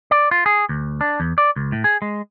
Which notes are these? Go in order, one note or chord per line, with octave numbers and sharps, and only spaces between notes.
D5
F4
G#4
D2
D4
E2
D5
C#2
A2
G#4
G#3